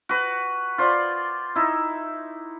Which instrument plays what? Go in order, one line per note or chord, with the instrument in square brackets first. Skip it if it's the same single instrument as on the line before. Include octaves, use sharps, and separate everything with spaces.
[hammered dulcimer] F#4 B4
F4 C5 D5
D#4 E4